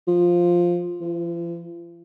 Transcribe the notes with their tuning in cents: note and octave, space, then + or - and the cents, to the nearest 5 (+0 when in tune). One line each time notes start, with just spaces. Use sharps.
F3 +5
F3 -45